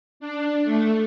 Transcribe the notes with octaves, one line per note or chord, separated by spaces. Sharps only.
D4
A3